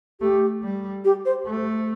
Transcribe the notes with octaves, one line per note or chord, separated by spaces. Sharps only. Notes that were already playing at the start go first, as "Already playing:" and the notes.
A3 G4
G3
G4
C5
A3